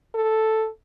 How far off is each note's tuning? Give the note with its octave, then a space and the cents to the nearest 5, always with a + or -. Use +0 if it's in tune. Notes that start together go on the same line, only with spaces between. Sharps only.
A4 +0